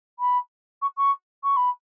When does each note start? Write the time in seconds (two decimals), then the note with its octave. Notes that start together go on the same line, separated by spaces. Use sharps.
0.19 B5
0.82 C#6
0.97 C#6
1.43 C#6
1.56 B5